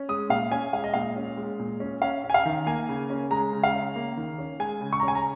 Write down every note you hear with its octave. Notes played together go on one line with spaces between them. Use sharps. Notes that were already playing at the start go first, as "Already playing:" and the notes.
Already playing: C#4
G#3 D#6
A#2 F5
C#4 G#5
G#3 F5
D#5
A#2 F5
C#4
G#3
A#2
C#4
C#4 F5
C#4
G#5
F5
D#3
A#3 G#5
C#3
C#4
G#3 A#5
C#3
F5
C#4
A#3
D#3
C#4
G#3 G#5
C#3
C#6
A#5
C#4 G#5
A#5